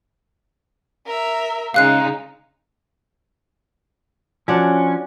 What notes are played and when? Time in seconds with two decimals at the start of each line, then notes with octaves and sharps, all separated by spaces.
1.06 A#4 E5
1.74 C#3 G#3 D#4 F5 F#6 C7
4.48 F3 C#4 D4 F#4 C#5